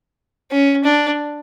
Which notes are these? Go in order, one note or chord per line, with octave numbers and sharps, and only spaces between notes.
C#4
D4